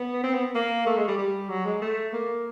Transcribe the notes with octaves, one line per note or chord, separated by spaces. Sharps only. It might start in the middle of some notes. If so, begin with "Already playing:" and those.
Already playing: B3
C4
B3
A#3
A3
G#3
G3
G3
F#3
G#3
A3
A#3